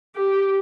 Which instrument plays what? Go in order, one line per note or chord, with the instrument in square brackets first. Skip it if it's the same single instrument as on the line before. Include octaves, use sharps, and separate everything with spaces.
[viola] G4